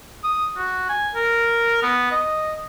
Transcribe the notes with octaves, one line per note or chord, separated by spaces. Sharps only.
D#6
F#4
G#5
A#4
B3
D#5